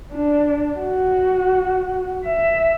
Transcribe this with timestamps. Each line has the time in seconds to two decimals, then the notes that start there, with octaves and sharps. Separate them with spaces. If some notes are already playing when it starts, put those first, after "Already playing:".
0.13 D4
0.79 F#4
2.26 E5